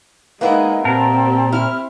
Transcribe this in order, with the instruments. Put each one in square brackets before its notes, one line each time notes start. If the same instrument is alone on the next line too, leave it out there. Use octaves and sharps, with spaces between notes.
[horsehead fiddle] G#3 D#4 [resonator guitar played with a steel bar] A#3 B3 E4
[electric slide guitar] A#2 A#4 [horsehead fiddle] C4 G4 [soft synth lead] A5
[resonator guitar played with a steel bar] E4 [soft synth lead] F6